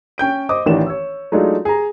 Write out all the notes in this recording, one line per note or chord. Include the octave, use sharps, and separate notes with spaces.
C#4 G5 G6 D7
C5 D#5 D6 D#6
A1 D#3 E3 D4 E7
C#5 E6
F#3 G#3 A3 D4 D#4 F4
G#4 A#5